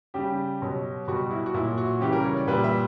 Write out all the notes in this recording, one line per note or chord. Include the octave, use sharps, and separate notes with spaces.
C#3 G3 G4
B2 F#3
B2 G3 F#4
E4
F#4
A#2 F#3 E4
F#4
C#3 E3 G3 G4
A#4
C#5
D5
A#2 G3 B4
E5